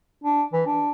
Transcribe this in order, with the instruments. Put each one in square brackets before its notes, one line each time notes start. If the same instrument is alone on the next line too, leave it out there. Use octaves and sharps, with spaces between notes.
[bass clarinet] D4
E3
D4